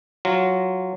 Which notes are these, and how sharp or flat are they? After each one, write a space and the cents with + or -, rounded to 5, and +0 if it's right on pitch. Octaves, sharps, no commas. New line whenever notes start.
F#3 +0 F4 +0